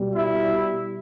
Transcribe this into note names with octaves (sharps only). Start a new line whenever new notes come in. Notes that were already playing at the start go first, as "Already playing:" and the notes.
Already playing: B2 G3
E4 E5